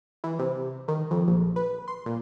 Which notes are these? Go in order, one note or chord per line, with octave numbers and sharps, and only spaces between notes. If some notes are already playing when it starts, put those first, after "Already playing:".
E3
C3
D#3
F2
A#1
B4
C6
A#2